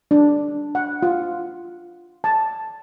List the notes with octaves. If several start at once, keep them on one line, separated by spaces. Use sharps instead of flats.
D4
F#5
F4
A5